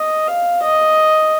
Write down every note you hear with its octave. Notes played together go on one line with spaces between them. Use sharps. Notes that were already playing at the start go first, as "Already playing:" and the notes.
Already playing: D#5
F5
D#5